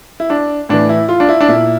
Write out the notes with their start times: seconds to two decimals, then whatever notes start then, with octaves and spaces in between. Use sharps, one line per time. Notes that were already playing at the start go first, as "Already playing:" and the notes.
0.20 E4
0.30 D4
0.69 A2 E3 D4
0.89 E4
1.09 F4
1.20 D4
1.29 E4
1.41 D4
1.48 A#2 E4